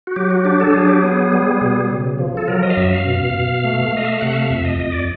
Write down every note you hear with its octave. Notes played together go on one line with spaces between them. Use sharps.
F#4
F#3 G4
F#4
D4 G4
A4
F#3 G#4
G4
B3 G#4
G3
B2
C#3
F3
A4
F#3 A#4
D#5
F5
F#2 E5
F5
B2
B2
A3
A3 D#5
E5
F5
C3 F#5
E5
F5
F2 E5
D#5
F2 D#5
D5